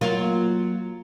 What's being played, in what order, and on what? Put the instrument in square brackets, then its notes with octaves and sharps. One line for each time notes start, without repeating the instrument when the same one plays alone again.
[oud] F#3 A#3 F4